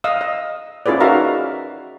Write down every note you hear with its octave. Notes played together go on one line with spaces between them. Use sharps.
D#5 F5 D#6 E6
D#5
C#4 E4 F4 G#4 B4 D5
D#4 F#4 A#4 E5 F5 A#5